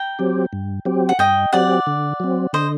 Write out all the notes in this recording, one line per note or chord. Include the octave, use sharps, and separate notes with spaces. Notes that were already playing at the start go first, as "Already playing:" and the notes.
Already playing: G5 A#5
F#3 C4 G4
G2
F#3 C4 G4
F#5
G2 D#5 G5
F#3 C4 G4 D5 F#5
D3
F#3 C4
D3 C5 D#5